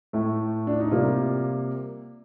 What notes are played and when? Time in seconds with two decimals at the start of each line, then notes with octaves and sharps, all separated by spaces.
0.13 A2 A3
0.67 D4
0.80 D#4
0.91 C3 G3 A#3 F4